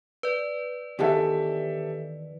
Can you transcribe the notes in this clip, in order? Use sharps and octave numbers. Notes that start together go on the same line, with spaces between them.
B4 D5
E2 D#3 E3 G4 A4 E5